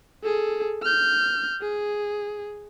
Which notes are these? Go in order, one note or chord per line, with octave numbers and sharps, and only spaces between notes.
G#4 A4
F6 G6
G#4